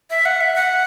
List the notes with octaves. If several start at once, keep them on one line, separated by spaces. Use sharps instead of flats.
E5
F#5
E5
F#5